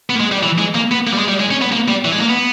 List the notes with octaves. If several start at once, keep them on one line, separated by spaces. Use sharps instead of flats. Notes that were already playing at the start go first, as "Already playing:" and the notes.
B3
A#3
G#3
G3
E3
G#3
A#3
B3
A#3
G3
G#3
G3
G#3
C#4
B3
A#3
G3
E3
G#3
A#3
B3